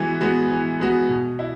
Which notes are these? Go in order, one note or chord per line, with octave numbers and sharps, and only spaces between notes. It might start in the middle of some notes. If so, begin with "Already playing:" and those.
Already playing: E3 G#3 B3 F#4
G#3 B3 F#4
E3
G#3 B3 F#4
B2
E4